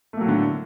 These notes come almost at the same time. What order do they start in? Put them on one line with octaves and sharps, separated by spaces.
A3 A#3 F#3 A2 D3